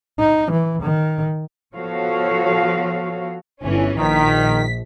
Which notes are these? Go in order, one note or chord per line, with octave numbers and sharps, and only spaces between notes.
D#4
E3
D#3
F3 B3 F#4 A4 C#5 F5
G1 E3 C#4
A#1 D#3 B6